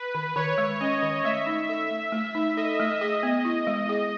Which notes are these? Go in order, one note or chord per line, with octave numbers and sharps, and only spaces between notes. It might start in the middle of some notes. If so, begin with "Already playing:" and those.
Already playing: B4
D#3
D#3 C#5
G#3
C#4 D#5
D#3
A3 E5
D#4
A4 E5
A3
A3
D#4
A4 D#5
A3
G#4 D#5
B3
E4
G#3
G#4